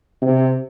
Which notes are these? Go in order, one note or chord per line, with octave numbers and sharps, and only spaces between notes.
C3